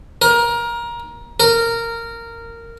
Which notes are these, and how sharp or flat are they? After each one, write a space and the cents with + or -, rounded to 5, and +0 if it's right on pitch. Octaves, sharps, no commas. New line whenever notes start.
A#4 +20
A#4 -15